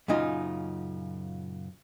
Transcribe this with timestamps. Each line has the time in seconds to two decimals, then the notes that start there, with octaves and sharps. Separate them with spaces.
0.08 F#2 A#2 C#3 D#4 F4